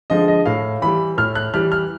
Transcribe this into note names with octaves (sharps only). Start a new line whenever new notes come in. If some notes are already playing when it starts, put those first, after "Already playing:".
D3 F3 G#3 D#5
D#5
A2 F5
E3 G3 B5
A2 F6
F#6
E3 G3 F6
F6